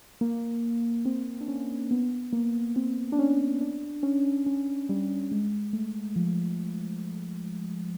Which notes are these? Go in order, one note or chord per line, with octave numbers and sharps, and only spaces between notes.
A#3
C4
D4
C#4
B3
A#3
C4
D4
C#4
D4
C#4
C#4
G3
G#3
A3
F3